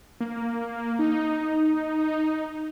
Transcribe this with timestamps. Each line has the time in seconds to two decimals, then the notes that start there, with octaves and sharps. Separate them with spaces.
0.21 A#3
0.99 D#4